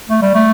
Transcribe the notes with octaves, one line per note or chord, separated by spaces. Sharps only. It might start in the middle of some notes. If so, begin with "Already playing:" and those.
A3
G3
A3